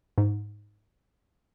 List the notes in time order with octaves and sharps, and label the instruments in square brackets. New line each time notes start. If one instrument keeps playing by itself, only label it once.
[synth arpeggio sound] G#2